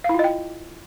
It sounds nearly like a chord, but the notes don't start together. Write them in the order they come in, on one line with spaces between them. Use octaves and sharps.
F5 E4 F4 D#5 G5